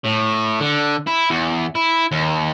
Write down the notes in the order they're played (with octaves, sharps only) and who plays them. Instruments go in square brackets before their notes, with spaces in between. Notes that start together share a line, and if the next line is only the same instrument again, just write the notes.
[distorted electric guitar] A2
D3
E4
E2
E4
D#2